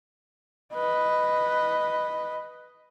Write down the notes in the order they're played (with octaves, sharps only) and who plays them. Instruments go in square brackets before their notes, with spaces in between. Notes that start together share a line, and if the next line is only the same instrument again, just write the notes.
[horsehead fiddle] B4 D#5